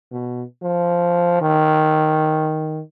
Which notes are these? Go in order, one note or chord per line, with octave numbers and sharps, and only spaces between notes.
B2
F3
D#3